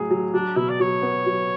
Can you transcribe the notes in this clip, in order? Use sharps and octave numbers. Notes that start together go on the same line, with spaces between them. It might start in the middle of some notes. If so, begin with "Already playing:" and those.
Already playing: A2 F#3 G#4
F#3
F#3 D4
B2 E4
D5
F#3 C#5
B3
F#3